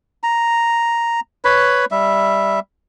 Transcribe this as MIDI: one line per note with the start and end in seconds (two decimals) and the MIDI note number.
0.23 1.20 82
1.45 1.85 71
1.45 1.85 73
1.45 1.85 83
1.91 2.60 55
1.91 2.60 76